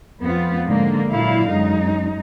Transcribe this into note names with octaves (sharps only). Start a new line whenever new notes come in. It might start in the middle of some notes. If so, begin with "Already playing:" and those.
F2 B3 C4 F4
G#2 D3 A#3
A#2 D3 F#3 E4 F5
F#2 G#3 D#4